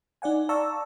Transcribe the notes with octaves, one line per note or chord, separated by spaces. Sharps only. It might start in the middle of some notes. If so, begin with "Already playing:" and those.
D#4 D5 F#5 G#5
D5 F5 A5 A#5 C#6 E6